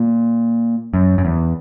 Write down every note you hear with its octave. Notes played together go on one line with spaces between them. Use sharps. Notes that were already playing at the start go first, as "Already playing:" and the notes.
Already playing: A#2
F#2
F#2
E2